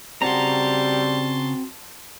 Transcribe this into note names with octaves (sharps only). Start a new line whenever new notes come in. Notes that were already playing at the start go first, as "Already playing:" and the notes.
C#3 G3 C4 F#4 A5 A#5 C6